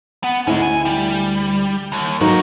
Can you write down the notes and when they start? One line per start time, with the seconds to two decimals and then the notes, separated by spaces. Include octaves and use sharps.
0.24 B3
0.47 D2 C#4 E4 D#5
0.62 G#5
0.85 G3
1.92 D#2
2.21 F#3 A#3 D#4 F#4 A#4